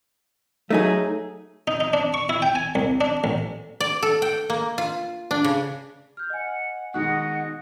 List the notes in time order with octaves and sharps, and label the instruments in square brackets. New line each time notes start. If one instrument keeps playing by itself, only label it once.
[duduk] F#3 [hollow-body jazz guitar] A3 D#4 G#4
[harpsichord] D#4
D#4
D4
C#6
E4
G5
G#5
C2
D4
A1
[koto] D5
A4
G5
A#3
F4
D4
C#3
[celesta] F6 G6
[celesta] D#5 G#5 [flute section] F#5
[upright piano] B2 D#3 G#3 [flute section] D#5 [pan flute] F#5 [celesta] F#6